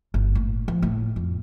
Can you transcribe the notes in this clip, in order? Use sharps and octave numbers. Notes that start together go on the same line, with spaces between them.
G1
A2
F3
A2
F2